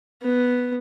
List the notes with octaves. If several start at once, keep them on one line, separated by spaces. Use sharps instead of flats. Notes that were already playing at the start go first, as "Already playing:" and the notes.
B3